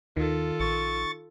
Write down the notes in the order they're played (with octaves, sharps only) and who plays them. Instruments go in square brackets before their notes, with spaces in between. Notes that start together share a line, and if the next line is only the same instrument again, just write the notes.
[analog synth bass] D#2 [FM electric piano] D#3 [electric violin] F4 A4
[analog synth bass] A#1 [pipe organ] C#6 A6